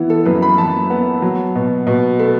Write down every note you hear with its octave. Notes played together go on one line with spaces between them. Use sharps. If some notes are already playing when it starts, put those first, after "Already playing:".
Already playing: E3 B3 E4
A4
F#2 B4
B5
F#2 A5
B3
F#3
B2
B2
A3